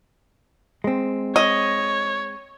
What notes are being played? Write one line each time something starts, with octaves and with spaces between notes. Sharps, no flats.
G#3 C4
C#5 D#5